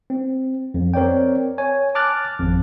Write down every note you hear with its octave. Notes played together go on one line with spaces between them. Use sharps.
C4
F2
C4 A#4 C#5 D5 G5
C#5 G#5
A5 D6 F6 F#6 A6
G#1 F2